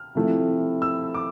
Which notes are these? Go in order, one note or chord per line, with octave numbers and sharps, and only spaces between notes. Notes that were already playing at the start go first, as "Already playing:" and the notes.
Already playing: F6
C3 F3 A3 E4
E6
D6